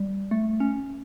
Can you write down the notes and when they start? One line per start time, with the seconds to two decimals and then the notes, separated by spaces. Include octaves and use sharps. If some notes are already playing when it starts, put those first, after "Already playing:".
Already playing: G3
0.31 A3
0.60 C#4